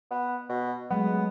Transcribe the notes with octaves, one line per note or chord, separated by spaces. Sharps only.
B3
B2
F#3 G#3 A3 B3